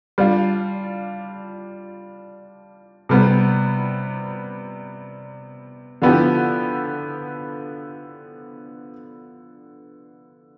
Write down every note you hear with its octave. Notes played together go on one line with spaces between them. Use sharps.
G3 D4 F4
C3 G3 B3
D3 F3 B3 E4 G4